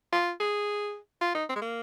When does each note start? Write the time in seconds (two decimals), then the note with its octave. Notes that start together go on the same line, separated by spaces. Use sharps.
0.13 F4
0.40 G#4
1.21 F4
1.35 D#4
1.49 C4
1.56 G#3
1.62 A#3